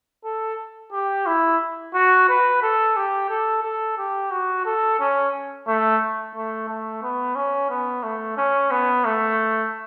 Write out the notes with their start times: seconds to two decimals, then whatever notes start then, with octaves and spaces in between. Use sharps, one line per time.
0.25 A4
0.92 G4
1.26 E4
1.94 F#4
2.29 B4
2.62 A4
2.96 G4
3.30 A4
3.63 A4
3.98 G4
4.31 F#4
4.65 A4
5.00 C#4
5.67 A3
6.35 A3
6.68 A3
7.03 B3
7.35 C#4
7.70 B3
8.03 A3
8.37 C#4
8.71 B3
9.05 A3